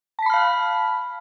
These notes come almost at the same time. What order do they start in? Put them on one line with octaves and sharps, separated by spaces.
A5 B6 B5 F6 F5